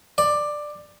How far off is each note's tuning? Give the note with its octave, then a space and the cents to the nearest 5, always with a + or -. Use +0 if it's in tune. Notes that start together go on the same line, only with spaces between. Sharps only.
D5 +10